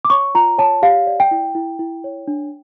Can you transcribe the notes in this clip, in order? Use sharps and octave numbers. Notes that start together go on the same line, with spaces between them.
D6
C#5 C#6
F4 A#5
C#5 A5
G4 F5
D5
G5
E4
E4
E4
C#5
D4